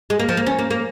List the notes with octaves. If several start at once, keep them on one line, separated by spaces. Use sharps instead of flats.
G#3
A#3
F3
A#3
C#4
A#3
A#3